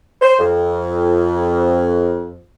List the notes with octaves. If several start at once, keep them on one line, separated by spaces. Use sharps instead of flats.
C5
F2